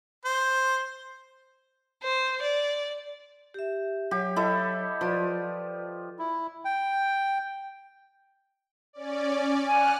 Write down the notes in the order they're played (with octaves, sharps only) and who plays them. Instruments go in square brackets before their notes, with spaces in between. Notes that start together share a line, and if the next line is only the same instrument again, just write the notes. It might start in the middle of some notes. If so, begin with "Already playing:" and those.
[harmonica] C5
[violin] C5
D5
[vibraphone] G4 E5
[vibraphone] F#3 C#5 [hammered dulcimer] G4
[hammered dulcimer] E4 A4 D#5
[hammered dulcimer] F3 [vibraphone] B4 D5
[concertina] E4
G5
[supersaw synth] C#4 D5
[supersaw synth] F#5 F6 F#6 [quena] G#5